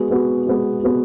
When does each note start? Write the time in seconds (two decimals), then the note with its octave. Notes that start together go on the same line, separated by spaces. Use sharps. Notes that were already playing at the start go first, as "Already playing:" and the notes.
Already playing: G#3 B3 F#4
0.10 G#3 B3 F#4
0.47 G#3 B3 F#4
0.83 G#3 B3 F#4